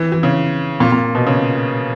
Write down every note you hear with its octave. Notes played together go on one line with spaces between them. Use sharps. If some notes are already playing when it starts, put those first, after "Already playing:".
Already playing: E3
E3
C#3
A#2
A#2
B2
C#3